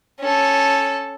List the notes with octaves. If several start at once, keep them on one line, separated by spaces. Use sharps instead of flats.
C#4 A4